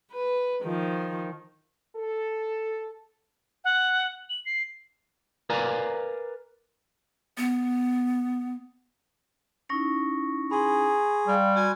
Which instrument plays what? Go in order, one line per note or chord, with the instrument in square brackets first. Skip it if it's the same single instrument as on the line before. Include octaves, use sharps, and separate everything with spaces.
[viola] B4
D#3 F3
[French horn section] A4
[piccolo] F#5
F#7
C7
[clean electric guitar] A#4 B4 D5 F5 G#5 A#5
[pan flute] B3
[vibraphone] C#4 D#4 E4 [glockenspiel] C#6 A#6 C#7
[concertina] G#4 [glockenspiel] B5 C6
[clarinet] G3 [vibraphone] D5 F5 G5
[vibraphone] F#4 B5 [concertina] G#5